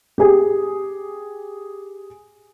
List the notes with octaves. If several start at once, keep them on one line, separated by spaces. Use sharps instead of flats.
G4 G#4